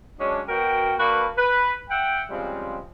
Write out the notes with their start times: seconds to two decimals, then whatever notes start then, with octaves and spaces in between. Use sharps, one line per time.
0.19 F#3 G#3 C#4 D4
0.48 B2 F#4 A#4 G5
0.99 A#3 D4 F#4 B4
1.38 B4
1.90 E5 F#5 G5
2.30 C#3 F3 G3 G#3 C4